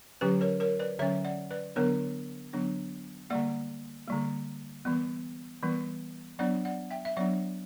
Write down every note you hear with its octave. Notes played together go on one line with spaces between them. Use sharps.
D3 F#3 C#4 G4 B4
A#4 C#5
A#4 C#5
B4 D5
D3 F#3 C#4 C#5 E5
D5 F#5
B4 D5
D3 F#3 B3 D4 A#4 C#5
D3 F#3 B3 D4
D3 G3 A#3 D5 F#5
D3 G3 A#3
E3 G3 B3
E3 G3 B3
F#3 B3 D4 D5 F#5
D5 F#5
E5 G5
E5
F#3 B3 D4 D5 F#5